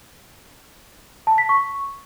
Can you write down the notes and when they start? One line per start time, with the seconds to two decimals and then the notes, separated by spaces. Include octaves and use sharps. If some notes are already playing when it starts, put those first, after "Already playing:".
1.27 A5
1.38 B6
1.49 C#6